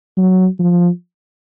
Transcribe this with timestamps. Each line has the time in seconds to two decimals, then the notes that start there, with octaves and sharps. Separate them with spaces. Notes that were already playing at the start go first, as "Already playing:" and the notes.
0.17 F#3
0.59 F3